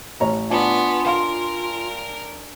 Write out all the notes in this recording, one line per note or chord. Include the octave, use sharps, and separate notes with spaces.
A1 C#5 A#5
B3 D4 F4 G#5 C#6
A#4 F5 C6